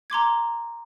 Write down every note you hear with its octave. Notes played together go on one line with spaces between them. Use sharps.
A#5 C6 D6 G#6